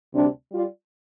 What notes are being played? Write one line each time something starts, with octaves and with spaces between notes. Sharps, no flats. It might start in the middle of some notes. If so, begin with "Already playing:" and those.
D2 C3 G3 D4
G3 F4 D5